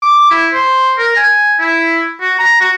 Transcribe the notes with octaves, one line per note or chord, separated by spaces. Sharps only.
D6
E4
C5
A#4
G#5
E4
F#4
A#5
F#4